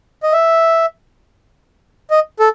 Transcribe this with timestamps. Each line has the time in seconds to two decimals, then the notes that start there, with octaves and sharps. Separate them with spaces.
0.23 D#5
0.32 E5
2.11 D#5
2.40 A4